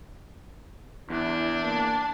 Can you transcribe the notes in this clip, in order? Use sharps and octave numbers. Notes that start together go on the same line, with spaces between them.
E2 D4 E4
A#3 A5